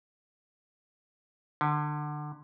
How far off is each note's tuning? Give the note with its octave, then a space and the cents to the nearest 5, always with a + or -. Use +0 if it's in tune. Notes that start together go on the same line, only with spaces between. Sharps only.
D3 +25